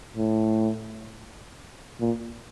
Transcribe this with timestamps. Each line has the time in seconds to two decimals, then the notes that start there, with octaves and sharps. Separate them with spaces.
0.16 A2
2.00 A#2